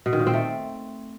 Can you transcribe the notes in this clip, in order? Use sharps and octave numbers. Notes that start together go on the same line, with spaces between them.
B2
D#3
A#2
C4
A3